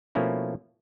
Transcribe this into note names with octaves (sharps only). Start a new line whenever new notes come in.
B2 F3 A3 A#3 C#4 E4